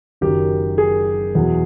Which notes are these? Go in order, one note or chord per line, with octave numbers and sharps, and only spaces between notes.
F#1 F#2 D#3 F#3 G4
G#4
E2 B2 F#3